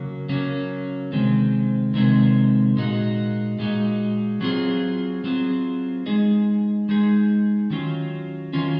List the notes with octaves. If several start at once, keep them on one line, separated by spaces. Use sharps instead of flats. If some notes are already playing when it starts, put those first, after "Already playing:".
Already playing: C#3 F#3 A#3 C#4
C#3 F#3 A#3 C#4
C3 D#3 G#3 C4
C3 D#3 G#3 C4
A#2 G#3 D#4 F#4
A#2 G#3 D#4 F#4
F#3 C4 F4 G#4
F#3 C4 F4 G#4
G#3 D#4 G#4
G#3 D#4 G#4
D#3 F#3 C#4 F4
D#3 F#3 C#4 F4